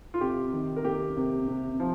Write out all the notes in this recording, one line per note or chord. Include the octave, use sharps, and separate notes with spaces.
F4
C3 G4
D#3
A#4
A#3 G4
C3
C3
F3